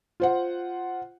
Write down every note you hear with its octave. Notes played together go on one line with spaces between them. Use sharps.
F4 C5 F#5